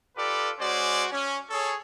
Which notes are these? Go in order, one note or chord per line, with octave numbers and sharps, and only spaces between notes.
F4 G4 A4 B4 D5
G#3 C#4 F#4 C5 D5
C#4
G#4 A4 C#5